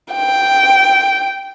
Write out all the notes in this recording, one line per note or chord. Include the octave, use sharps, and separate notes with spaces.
G5